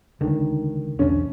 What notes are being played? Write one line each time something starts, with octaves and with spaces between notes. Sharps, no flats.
C#2 D3 D#3
B1 E2 C#4 D4